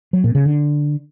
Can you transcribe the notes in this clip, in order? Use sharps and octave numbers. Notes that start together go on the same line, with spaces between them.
F#3
A#2
C#3
D3